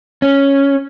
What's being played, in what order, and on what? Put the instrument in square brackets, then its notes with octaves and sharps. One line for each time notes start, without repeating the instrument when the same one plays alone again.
[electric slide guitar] C#4